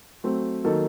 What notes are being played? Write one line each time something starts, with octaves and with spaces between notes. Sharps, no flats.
F#3 A3 C4
D#3 F#3 A#3 D#4 A4